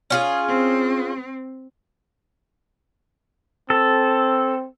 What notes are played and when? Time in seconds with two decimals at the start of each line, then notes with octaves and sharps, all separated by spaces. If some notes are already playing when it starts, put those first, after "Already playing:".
0.10 C#4 F4 G#4
0.48 C4
3.70 C4 A4